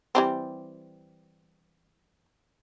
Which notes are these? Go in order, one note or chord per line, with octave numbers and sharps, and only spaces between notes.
E3 G3 C4